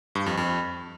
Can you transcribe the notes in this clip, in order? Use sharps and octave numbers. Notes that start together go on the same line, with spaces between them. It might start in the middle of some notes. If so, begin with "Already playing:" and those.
G2
F2
F2